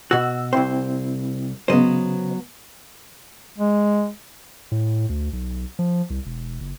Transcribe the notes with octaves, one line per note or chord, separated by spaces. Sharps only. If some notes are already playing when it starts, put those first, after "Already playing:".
B2 F#4 E6
C2 C4 E4 C5
C#3 F#3 B3 C5 D#5
G#3
A2
D2
B1
F3
C2
E1
F#1